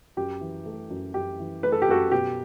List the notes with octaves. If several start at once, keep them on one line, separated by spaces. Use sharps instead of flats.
F#2 G4
E3
A3
F#2
F#2 G4
E3
A3 B4
A4
G4
F#2 F#4 A4
B2 G4